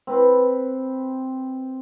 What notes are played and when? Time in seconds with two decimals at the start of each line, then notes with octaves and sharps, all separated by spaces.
0.07 C4 B4